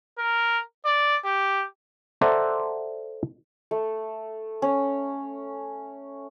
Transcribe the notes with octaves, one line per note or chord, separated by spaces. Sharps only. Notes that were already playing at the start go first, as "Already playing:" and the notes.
A#4
D5
G4
A4 C5 D5 E5 F#5 A#5
A3
C#4